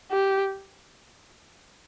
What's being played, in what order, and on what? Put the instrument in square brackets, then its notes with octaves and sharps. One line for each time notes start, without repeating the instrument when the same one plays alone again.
[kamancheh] G4